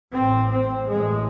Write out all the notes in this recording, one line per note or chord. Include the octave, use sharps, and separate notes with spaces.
A1 A2 C4
C4
A1 A2 G#3